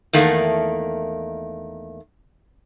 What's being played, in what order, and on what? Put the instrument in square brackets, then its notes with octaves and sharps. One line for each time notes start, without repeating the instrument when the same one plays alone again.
[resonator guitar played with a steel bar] E2 D#3 A3 A#3